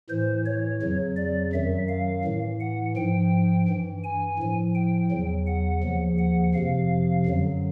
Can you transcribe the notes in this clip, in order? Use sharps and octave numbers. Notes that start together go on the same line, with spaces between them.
A2 E3 C5
C#5
F2 C#3 F#3
D5
F#2 D#3 F#3 E5
F5
A2 E3
F#5
G#2 F3 G5
G2 E3
G#5
A2 F3
G5
E2 C#3 F#3
F#5
D#2 C#3 F3
F#5
F2 C3 F3 F5
F#2 D3 F#3